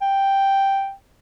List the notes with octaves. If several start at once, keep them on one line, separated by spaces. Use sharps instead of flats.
G5